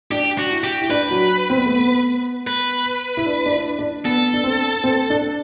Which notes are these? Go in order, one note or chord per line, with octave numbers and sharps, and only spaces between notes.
D4 G4
F#4
E4
G4
E4
D4 B4
F#3
C4
B3
A3
B3
B4
E4
D4
D4
E4
D4
B3 A4
D4
C4
C4
D4